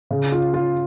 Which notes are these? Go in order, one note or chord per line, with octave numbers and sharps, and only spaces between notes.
C#3
F4
F4